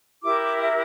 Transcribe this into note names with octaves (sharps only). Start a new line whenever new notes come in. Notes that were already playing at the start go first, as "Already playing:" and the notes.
E4 G4 A#4 D6
D6
E5